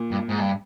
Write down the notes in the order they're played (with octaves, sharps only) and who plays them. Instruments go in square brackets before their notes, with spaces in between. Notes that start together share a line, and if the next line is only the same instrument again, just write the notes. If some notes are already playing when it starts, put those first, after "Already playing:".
Already playing: [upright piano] A#2
[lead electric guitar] G2
G#2
G2